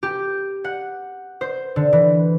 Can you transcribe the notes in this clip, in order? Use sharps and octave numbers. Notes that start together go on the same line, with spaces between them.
G4
F#5
C5
D3
E3